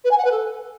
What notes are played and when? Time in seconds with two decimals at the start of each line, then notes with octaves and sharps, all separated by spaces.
0.04 B4
0.11 G#5
0.17 F#5
0.24 B4
0.31 A4